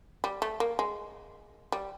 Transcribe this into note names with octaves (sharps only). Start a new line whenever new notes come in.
G3
A3
A#3
G#3
G3